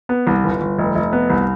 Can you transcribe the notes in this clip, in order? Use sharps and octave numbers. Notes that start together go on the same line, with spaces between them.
B3
C2
G1
G1
F1
F1
B3
C2